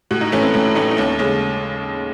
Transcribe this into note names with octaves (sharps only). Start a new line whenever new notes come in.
A2 F#4
D#4
E3 A3 C#4
C4
A2 C#4
E3 A3 D#4
D#4
D#2 C#4
C#3 G#3 C#4